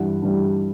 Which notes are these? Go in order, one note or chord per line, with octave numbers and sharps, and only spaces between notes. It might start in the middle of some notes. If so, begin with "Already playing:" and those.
Already playing: G2 E3 G3 F#5
G2 E3 G3